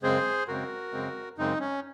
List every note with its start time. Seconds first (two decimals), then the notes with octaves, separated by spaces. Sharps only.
0.03 F#2 C#3 G#3 C4 G#4 C5
0.48 F#2 C#3 G#3 C4 F#4 A#4
0.93 F#2 C#3 G#3 C4
1.38 F#2 C#3 G#3 C4 D#4
1.60 C#4